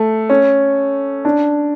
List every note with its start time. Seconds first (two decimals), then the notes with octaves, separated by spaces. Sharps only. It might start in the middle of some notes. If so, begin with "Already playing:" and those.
Already playing: A3
0.30 C#4
1.25 D4